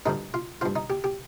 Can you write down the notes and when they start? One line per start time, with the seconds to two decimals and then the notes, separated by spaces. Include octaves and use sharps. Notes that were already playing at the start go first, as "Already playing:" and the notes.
0.06 G2 D3 F3 D#4
0.34 F4
0.61 G2 F3 F4
0.76 D#4
0.90 G4
1.04 G4